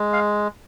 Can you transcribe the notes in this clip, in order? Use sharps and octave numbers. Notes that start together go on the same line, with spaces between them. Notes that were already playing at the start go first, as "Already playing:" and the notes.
Already playing: G#3
F5